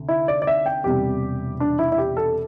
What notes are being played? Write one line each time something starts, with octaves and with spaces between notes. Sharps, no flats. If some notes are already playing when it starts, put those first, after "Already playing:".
Already playing: D2 C3
E4
D5
D5
E5
G5
E1 E2 C3 G3 G4
D4
E4
E4
G4
A4